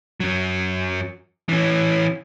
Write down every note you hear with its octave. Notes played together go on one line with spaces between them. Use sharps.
F#2 F#3
E3 C#4